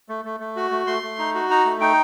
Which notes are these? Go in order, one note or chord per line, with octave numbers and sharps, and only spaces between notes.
A3
A3
A3
F#4
A3
A3 C6
A3
D#4
F#4
D#4 A#5
A3
D#4 G5